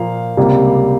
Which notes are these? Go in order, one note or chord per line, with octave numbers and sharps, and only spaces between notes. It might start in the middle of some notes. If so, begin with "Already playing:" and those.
Already playing: A#2 F3 A#3 F5
C#2 C3 G3 A#3